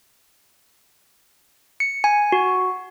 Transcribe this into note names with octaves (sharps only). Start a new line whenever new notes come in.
C#7
G#5
F#4